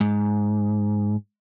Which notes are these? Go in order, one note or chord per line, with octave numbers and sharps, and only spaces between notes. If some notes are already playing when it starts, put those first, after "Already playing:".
G#2